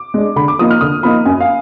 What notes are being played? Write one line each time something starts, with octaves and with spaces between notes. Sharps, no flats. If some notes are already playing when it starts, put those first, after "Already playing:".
Already playing: D6
G#3 D4
D3 B5
D6
F3 A#3 D#4 D#6
F6
D3 D#6
F3 A#3 D#4 B5
F#2 G#5
F5